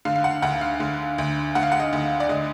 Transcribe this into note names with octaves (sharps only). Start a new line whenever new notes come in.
D3 F5
F5
F#5
D2 F#5
F5
D3
D2
D3 F#5
F5
F#5
D#5
D2
D5
D3 D#5